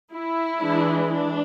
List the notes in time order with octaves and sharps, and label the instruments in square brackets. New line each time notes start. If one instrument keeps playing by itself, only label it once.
[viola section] E4
E3 G#3 D4
D4